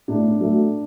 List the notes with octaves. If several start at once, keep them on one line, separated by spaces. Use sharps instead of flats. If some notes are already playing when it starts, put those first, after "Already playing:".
A2 D4
F#3 A3